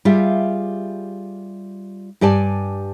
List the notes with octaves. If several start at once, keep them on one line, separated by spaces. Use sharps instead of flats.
G3 F4 G4 G#4 E5 F5
G2 G4 D5 G#5 A5